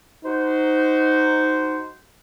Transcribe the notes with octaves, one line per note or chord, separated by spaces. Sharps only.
D#4 F#4 C5